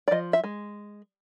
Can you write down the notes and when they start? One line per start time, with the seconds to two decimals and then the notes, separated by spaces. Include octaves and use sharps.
0.08 D5
0.11 F3 D#5
0.33 E5
0.44 G#3